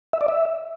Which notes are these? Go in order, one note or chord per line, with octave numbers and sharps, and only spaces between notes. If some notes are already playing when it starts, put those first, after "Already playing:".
E5
D5
E5